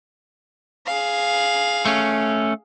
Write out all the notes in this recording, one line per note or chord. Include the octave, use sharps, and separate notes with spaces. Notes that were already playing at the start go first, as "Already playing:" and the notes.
G#4 F5
A3 C#4